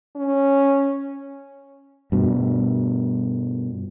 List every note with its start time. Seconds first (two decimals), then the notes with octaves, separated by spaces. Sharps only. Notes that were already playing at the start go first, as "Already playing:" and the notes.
0.16 C#4
2.12 G2 B2